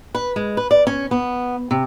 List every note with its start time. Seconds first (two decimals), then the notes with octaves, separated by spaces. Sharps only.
0.15 B4
0.36 G#3
0.57 B4
0.71 D5
0.87 C#4
1.11 B3
1.71 C3